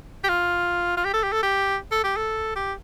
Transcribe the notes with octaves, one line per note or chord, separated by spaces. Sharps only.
G4
F4
F4
G4
A4
G4
A4
G4
A4
G4
A4
G4